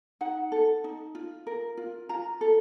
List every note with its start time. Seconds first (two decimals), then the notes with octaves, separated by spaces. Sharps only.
0.21 D#4 F#5
0.52 A4
0.84 D#4
1.15 F4
1.47 A#4
1.77 F4
2.09 F4 A#5
2.41 A4